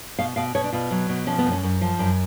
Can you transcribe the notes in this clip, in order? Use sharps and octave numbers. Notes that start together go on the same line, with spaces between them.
B2 F5
B2 F5
B2 C#5
D4
B2 F4
F#3
B2
F3 C#4
B3
F#2
C#4
F#2
F3
F#2